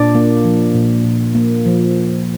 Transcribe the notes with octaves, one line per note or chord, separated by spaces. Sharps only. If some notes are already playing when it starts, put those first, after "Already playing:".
Already playing: A#2 D4 D5
A#3
F3
A#2
A#2
A#3
F3